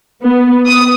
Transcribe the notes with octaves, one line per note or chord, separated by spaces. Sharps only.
B3
D#6